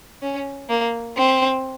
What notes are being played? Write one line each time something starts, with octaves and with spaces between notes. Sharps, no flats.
C#4
A#3
C4